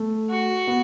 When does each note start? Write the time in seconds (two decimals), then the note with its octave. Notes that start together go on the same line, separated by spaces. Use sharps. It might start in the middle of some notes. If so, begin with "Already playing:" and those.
Already playing: A3
0.30 F#4
0.68 B3